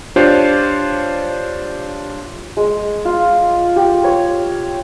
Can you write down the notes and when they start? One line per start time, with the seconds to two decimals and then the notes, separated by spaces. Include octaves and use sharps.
0.16 D4 F4 G4 C5 C#5
2.57 G#3
3.05 F4
3.76 G4
4.04 C#5